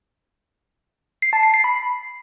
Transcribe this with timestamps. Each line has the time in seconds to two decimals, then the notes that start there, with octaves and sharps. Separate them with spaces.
1.22 C7
1.33 A5
1.43 C7
1.54 C7
1.64 B5